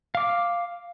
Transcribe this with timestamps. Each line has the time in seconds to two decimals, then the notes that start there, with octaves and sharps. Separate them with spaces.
0.15 F5 D6